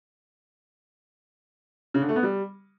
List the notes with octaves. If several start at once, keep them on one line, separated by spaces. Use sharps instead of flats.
C#3
D3
A3
B3
G3